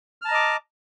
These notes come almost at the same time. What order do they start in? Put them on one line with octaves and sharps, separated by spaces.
F6 A5 A#5 D#5 D6